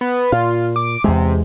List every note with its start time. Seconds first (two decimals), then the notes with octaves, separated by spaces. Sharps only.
0.01 B3
0.32 A#2 F4
0.76 D6
1.04 E2 C3 G#3